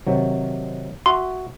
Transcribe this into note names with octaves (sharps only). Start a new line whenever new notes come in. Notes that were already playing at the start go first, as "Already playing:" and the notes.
C3 D#3 F#3
F#4 E5 C6